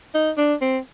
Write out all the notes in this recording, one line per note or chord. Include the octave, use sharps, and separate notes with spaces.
D#4
D4
C4